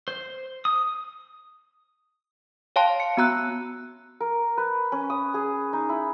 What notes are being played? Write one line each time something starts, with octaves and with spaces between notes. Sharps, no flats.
C5
D#6
C#5 F5 G5 A5 C6
C#7
B3 F#4 A#5 E6 F#6
A#4
B4
C#4
D#6
G#4
D#4
E4